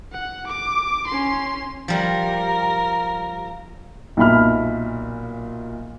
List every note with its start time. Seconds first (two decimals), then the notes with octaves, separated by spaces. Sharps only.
0.12 F#5
0.48 D6
1.08 C#4 C6
1.88 F3 G3 A#4
4.17 B1 A#2 E5 B5 F6